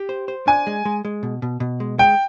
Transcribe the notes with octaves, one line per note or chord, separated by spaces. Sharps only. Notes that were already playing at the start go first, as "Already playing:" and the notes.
Already playing: G4
C5
C5
D4 G#5
G#3
G#3
G#3
B2
B2
B2
G#3
G#3 G5